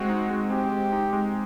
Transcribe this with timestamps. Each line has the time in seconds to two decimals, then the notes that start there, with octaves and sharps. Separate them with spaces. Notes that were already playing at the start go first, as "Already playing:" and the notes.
Already playing: G#3 C4 F#4
0.09 D#4
0.30 G#3
0.50 C4 G4
0.71 G#3
0.92 D#4
1.13 G#3